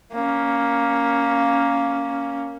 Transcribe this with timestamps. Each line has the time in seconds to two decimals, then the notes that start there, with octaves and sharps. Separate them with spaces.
0.13 A#3 C#4